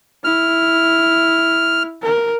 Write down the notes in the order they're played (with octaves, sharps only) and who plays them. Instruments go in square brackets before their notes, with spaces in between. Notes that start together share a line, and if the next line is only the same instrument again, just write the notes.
[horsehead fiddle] E4 [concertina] F6
[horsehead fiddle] A#4